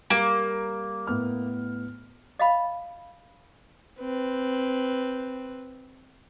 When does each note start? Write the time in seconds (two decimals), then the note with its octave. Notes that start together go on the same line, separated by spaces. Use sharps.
0.10 G3 A#3
1.07 A2 B3 F6
2.39 D#5 F5 B5
4.00 C4 B4